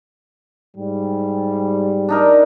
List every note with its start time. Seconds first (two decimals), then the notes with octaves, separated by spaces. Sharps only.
0.76 G#2 G3
2.09 D4 D#4 A#4